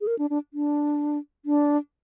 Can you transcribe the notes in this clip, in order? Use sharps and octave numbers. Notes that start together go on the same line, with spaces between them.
G#4
A#4
D4
D4
D4
D4